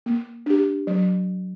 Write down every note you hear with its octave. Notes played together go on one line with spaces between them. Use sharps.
A#3
D4 G4
F#3